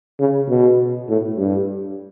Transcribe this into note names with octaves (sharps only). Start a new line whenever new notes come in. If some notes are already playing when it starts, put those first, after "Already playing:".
C#3
B2
A2
G2